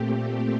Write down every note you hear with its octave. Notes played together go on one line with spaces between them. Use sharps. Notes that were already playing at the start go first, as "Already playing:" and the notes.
Already playing: A#2 A3 C4 G4